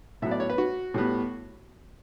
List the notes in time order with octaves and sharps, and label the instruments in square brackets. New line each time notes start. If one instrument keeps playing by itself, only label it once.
[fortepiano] A2 F#3 B3 E5
D5
C#5
B4
F#4
A2 G3 B3